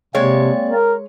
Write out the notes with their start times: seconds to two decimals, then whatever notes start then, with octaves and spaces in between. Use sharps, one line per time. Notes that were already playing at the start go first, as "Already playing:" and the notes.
0.15 C3 G#3 A#3 C4 C#5 D5
0.69 A#4